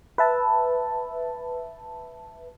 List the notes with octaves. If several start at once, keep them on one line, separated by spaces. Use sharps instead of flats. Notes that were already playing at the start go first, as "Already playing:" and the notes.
B4 E5 A5